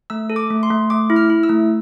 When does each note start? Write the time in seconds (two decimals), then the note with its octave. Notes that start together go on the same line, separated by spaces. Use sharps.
0.10 A3 E6
0.30 A4
0.36 D6
0.50 A3
0.63 C6
0.70 A3
0.90 A3 D6
1.10 E4
1.16 F6
1.30 E4
1.43 E6
1.49 A3